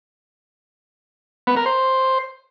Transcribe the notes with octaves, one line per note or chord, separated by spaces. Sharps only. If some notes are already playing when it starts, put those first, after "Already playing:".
B3
A#4
C5